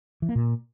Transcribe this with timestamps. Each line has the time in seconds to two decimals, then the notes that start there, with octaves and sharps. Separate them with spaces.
0.22 E3
0.29 A#3
0.35 A#2